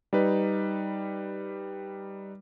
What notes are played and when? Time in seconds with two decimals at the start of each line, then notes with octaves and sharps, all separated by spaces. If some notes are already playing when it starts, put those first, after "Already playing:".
0.13 G3 D#4 B4